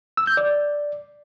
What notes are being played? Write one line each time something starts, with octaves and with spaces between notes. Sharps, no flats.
E6
G6
D5